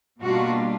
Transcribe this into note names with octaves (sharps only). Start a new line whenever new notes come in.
B2 G3 A#3 D4 F4 F#4